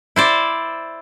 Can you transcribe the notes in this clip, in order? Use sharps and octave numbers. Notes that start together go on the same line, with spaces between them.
E4 C5 D5